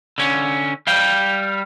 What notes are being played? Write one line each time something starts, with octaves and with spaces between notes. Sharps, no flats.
D3 C#4
G3 F5 G5